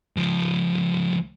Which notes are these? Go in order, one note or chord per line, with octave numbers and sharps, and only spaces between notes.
C#2 F3